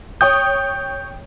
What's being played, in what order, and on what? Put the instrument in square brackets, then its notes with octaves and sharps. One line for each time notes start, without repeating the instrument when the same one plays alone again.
[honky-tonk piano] C#5 G5 D#6 [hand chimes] G6